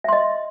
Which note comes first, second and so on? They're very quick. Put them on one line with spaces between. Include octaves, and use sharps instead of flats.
E5 C6 D#5